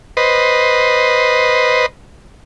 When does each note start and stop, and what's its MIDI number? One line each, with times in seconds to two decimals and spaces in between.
0.17 1.86 71
0.17 1.86 72
0.17 1.86 75